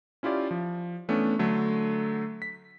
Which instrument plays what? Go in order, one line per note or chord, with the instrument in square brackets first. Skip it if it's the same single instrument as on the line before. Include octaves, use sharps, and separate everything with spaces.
[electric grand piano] C#4 E4 F4 G4 D5
F3
E3 A3 B3 C#4 D4
D3 F#3 A3
B6